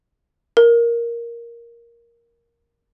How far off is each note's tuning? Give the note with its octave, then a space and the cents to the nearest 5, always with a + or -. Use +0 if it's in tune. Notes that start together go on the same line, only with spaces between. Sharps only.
A#4 +5